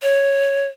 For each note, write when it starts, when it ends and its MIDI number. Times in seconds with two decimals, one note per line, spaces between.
0.02 0.67 73